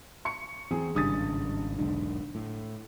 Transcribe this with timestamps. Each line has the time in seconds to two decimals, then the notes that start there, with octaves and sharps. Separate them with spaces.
0.25 C#6 C#7
0.71 E2 C4 G#4
0.95 G#1 G2 C#3 G3 D#6 A6
1.78 E1 B1 G#2 D3
2.35 A2